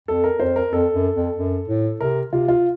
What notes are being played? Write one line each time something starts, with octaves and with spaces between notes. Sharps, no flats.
F2 A4
A#4
F2 C5
A#4
F2 A4
F#2
F2
F#2
A2
C3 A#4
C3 F4
F4